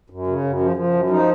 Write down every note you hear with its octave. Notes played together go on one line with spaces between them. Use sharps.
F#2
C#3
F#2
F3
F3
F#2
F3 D#4